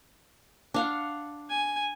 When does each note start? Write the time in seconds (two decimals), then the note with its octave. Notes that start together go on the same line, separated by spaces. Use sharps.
0.74 D4 F5 F#5
1.49 G#5